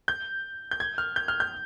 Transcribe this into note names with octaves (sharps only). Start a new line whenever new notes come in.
G6
G6
G#6
F6
G6
F6
G6